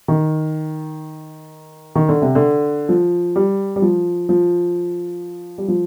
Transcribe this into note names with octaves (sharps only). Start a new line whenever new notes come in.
D#3
D#3
D3
C3
D3
F3
G3
G3
F3
F3
G3
F3